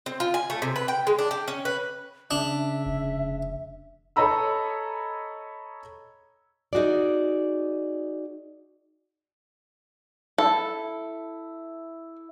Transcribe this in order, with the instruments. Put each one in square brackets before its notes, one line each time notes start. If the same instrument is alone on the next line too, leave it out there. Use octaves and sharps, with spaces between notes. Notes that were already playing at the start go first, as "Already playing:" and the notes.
[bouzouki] C4
F4
G#5
A3
C3
B4
G5
G#3
D4
G4
C#4
B4
[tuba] C#3 [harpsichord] D4 [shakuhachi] E5
[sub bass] F1
[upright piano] A4 C#5 D#5 A#5 B5 E6
[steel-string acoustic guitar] D#4 F#4 G#4 D5
[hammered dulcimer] E4 [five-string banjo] A4